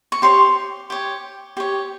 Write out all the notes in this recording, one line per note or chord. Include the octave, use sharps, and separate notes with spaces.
C#6
G4 C#5 C6
G4 C#5
G4 C#5